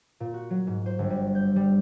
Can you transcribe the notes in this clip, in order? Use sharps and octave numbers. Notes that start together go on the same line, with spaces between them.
A#2
F#4
F#3
G#2
C5
G1
G3
G6
G3